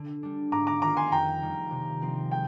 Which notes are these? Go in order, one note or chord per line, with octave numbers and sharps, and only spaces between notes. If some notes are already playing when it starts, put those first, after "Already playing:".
Already playing: D3
G3 D4
G#2 A#5 D6
A#5 D6
D#3 G3 A#3 F4 A#5 D6
G#5 C6
F2 G5 A#5
D#3 G3 A#3
C3
F3 C4
G#3 G5